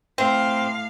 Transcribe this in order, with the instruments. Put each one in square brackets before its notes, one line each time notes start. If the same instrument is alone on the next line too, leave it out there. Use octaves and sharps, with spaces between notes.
[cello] A2 F5 [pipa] C4